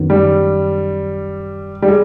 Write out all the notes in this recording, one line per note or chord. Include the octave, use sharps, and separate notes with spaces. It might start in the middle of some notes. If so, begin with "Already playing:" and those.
Already playing: F#2 D#3 F#3 B3
G3
G3
G#3